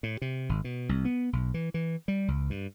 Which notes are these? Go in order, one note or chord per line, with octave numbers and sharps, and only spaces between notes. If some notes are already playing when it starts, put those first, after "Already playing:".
A2
C3
G#1
B2
C2
B3
B1
E3
E3
G3
C#2
G2